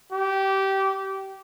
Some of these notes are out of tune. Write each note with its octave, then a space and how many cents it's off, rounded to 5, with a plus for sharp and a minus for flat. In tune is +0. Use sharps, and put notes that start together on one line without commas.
G4 -20